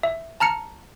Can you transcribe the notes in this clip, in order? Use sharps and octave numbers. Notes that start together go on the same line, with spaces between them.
E5
A5 A#5 F6 C#7